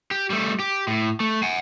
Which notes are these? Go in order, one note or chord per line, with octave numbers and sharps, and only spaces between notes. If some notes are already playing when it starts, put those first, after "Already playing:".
G4
G3 A3
G4
A2
A3
F#5 G#5